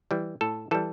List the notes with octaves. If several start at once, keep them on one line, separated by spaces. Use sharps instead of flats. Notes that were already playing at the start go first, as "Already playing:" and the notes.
E3 G3
A2 A4
E3 G3 A4